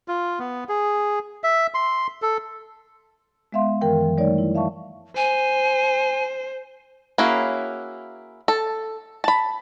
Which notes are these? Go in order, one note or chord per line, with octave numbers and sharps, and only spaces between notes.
F4
B3
G#4
E5
C6
A4
G#3 B3 E5 F5 C6
F#2 D#3 E3 A#4 G5
F3
G3 A3 D#4 C#5 D5
E4
E5 F5 A5 C#6
C5 G#5
A#3 C#4 E4 F#4 G#4
A4
A5 B5